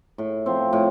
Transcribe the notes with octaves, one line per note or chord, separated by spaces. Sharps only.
A2
F3 C4
A2